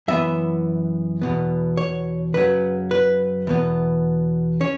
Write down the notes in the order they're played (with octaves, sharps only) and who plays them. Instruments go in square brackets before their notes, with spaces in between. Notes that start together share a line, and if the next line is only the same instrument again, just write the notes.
[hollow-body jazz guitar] F#2 E3 B3 E5
E2 B2 B3
C#5
F#2 C#3 F#3 B4
B4
E2 B2 B3
C#4 C#5